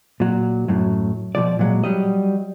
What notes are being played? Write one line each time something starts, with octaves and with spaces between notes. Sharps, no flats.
A#2 F#3
F#2 A2 F#3
B2 E3 F3 D5
A#2 F#3 G#3
F#3 G3 D#5